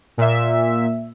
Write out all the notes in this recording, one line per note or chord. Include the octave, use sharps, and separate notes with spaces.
A#2 E5